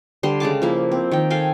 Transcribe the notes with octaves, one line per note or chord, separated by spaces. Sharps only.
D3 G3 C6
C#3 G#3 A5 D6
F3 A#3 E4
C4
D#3 G5
A4 F5 G5 G#5